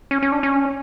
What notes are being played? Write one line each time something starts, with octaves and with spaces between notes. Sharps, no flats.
C#4
C#4
D4
C#4